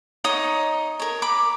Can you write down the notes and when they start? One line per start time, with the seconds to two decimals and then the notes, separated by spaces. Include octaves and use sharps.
0.24 D#4 C#5 D#5 D#6
1.00 A#4 C#5
1.22 A#5 B5 D6